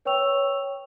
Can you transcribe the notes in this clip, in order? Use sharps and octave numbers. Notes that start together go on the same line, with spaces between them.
B4 C#5 G5 C#6 E6 F7